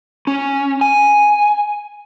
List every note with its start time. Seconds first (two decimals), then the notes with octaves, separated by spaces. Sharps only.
0.27 C#4
0.81 G#5